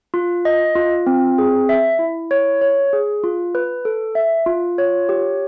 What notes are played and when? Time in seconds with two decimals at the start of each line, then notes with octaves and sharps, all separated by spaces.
0.14 F4
0.45 D#5
0.75 F4
1.07 C4
1.38 G#4
1.69 E5
1.99 E4
2.31 C#5
2.61 C#5
2.93 G#4
3.24 F4
3.55 B4
3.85 A4
4.15 E5
4.46 F4
4.78 C#5
5.09 G4